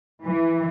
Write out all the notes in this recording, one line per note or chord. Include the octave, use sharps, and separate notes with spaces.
E3